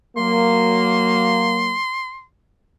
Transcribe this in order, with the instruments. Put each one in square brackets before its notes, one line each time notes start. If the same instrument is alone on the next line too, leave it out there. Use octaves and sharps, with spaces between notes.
[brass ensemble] F#3 A#3 [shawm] C6